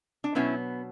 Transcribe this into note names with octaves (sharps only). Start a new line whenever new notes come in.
D4
B2 F#3 B3 C#4 E4